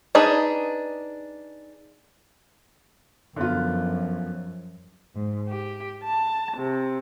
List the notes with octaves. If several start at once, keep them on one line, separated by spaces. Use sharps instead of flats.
D4 D#4 G#4 B4
F#2 D3 F3 B3 F4
G#2
G4
A5
C3